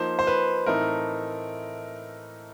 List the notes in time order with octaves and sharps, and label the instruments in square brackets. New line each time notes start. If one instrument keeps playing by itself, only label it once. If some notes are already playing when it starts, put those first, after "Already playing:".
Already playing: [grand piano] F3 A#3 D#4 C5
C5
B4
A2 E3 A3 C4 D#4 A#4